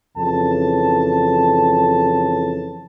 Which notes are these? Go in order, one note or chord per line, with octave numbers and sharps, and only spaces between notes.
F2 C#3 E3 A4 A5